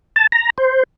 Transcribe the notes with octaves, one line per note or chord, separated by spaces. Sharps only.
A5
A#5
C5